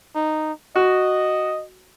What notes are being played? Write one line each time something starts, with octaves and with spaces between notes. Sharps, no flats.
D#4
F#4 D#5